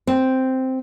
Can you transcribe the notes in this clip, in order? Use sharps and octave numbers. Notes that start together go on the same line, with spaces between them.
C4